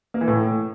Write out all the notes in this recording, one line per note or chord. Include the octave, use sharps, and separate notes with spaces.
A#3
E3
A2